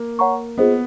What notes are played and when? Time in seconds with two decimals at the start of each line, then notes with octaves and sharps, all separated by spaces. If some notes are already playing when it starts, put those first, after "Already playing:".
Already playing: A#3
0.19 C#5 F#5 A#5 C#6
0.58 B3 F4 G#4 C5 D#5